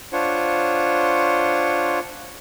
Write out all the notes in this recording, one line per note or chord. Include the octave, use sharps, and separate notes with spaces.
D4 F4 C5 C#5 F#5